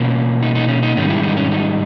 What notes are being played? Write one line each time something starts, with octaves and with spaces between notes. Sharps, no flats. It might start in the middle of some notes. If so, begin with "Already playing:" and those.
Already playing: B2 A#3 C#4
D#4
D#4
C#4
D#4
G#2 D#3 G3 C#4
E4
D#4
C#4
D#4